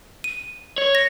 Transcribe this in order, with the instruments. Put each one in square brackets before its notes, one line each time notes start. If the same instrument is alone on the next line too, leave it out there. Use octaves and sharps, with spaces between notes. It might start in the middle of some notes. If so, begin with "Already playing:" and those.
[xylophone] D#7
[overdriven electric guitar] C#5
[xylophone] A#6